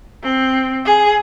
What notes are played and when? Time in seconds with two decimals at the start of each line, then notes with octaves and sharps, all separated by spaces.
0.23 C4
0.85 G#4